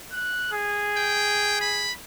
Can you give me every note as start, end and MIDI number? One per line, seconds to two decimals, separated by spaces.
0.13 0.48 90
0.52 1.96 68
0.96 1.59 79
1.61 1.93 83